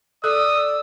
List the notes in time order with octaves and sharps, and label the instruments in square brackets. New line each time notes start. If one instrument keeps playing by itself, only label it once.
[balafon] A4 [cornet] D5 [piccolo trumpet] D#6 [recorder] E6